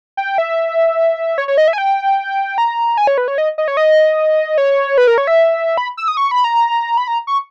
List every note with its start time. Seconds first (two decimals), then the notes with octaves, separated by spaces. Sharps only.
0.17 G5
0.38 E5
1.38 C#5
1.48 C#5
1.58 D#5
1.68 E5
1.73 G#5
1.78 G5
2.58 A#5
2.97 G#5
3.07 C#5
3.18 B4
3.28 C#5
3.38 D#5
3.58 D#5
3.68 C#5
3.77 D#5
4.58 C#5
4.98 B4
5.07 A#4
5.18 C#5
5.27 E5
5.77 B5
5.97 E6
6.08 D#6
6.17 C#6
6.31 B5
6.44 A#5
6.97 B5
7.08 A#5
7.27 C#6